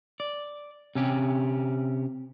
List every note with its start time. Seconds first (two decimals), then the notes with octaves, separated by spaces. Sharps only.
0.20 D5
0.95 C3 C#4 G4